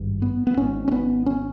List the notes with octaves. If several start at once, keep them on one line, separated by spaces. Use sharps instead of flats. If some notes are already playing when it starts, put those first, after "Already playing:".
Already playing: G#1 G2
B3
B3
G#1 G#2 C#4
C#4
B3
C#4